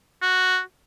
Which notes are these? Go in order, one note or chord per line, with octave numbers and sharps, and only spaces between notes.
F#4